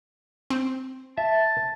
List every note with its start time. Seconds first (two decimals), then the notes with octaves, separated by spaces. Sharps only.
0.50 C4
1.17 E5 A5